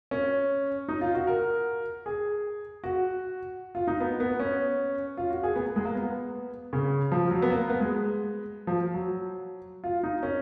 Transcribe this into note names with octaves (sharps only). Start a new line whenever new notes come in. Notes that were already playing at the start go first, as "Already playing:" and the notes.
C#4
D#4
F4
F#4
A#4
G#4
F#4
F4
D#4
B3
B3
C#4
F4
F#4
G#4
B3
A#3
G#3
A#3
B3
C#3
F3
F#3
B3
A#3
B3
G#3
F3
F#3
F4
D#4
C#4